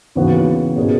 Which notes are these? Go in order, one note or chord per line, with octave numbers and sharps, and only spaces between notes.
D#2 C#3 E3 B3 F#4
B2 A#3 C#4 G#4